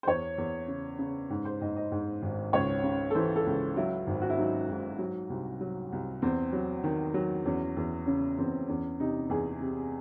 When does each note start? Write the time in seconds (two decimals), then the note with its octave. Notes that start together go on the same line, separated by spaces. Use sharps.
0.03 C5
0.07 E2 C#5
0.38 E2
0.68 C#3
0.99 C#3
1.30 G#2
1.45 C5
1.61 G#2 D#5
1.76 D#5
1.92 G#2
2.22 G#1
2.53 C#2 C#5
2.84 C#3
3.11 A4
3.15 E3 C5
3.36 A4
3.46 C#2
3.77 F#3 E4
4.07 G#1
4.21 F#4
4.30 E4
4.38 F#3 D#4
4.69 G#2
4.99 F#3
5.30 C2
5.61 F#3
5.92 C2
6.22 E2 C4
6.53 F#3
6.84 D#3
7.14 F#3
7.45 E2 C#4
7.77 E2
8.07 C#3 C#4
8.38 E2 C4
8.68 E2 C#4
9.00 C3 D#4
9.30 E2 G#4
9.60 C3